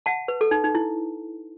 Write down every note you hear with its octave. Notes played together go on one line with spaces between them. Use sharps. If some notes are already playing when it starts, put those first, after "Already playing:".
F#5 A5
B4
A4
D#4
D#4
E4